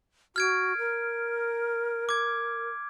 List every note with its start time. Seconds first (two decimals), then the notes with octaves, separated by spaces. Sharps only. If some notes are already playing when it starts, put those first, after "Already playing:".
0.36 F#4 F6 G#6 D7
0.78 A#4
2.09 D6 G#6